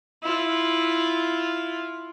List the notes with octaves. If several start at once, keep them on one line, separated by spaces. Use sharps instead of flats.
E4 F4